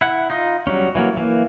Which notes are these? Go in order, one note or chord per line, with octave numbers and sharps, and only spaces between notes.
E4 F#5
D#4 F4 D#5
F#3 G3 C#4
E3 F#3 A#3
E3 A#3